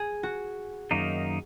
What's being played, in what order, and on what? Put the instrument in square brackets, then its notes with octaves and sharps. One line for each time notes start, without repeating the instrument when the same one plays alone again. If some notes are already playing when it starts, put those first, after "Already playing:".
Already playing: [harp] G#4
F#4
[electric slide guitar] F#2 D#3 A#3 D#4